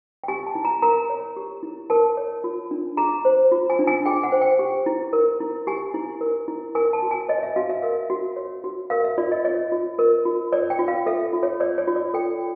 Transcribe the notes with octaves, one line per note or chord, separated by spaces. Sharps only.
G5
G4 G#5
A5
E4
A#5
A#4 A#5
C#5
G4
E4
A#4 A5
C#5
F4
D4
G#4 A#5
C5
F4
G#5
D4
G#5
G#4 G5
F#5
C5
G5
G4
E4
A#4
E4
G4 G#5
E4
A#4
E4
A#4 G#5
A5
F#4
G#5
C#5 D#5
E5
F#4 F5
E5
A#4 F5
F#4
C#5
F#4
A#4 F5
E5
F4 D5
D#5
C#5 D#5
F4
A#4
F4
C#5 D5
G5
F4
F5
A4 E5
F4
C#5
C#5 D5
C#5
F4
D5
A4 G5